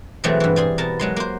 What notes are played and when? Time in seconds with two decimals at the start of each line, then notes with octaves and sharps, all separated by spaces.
0.24 B2 E3 F#3 G#3 A3 C4
0.40 G2 E3
0.56 G3 G#4 C6
0.78 B2 A#4 A5
0.99 F#3 G#3 C6
1.16 A#3 C5